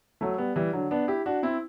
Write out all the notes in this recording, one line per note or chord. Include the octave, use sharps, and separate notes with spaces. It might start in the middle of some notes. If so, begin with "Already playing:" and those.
F#3 A3
G3 B3
E3 G3
D3 F#3
B3 D4
E4 G4
D4 F#4
C4 E4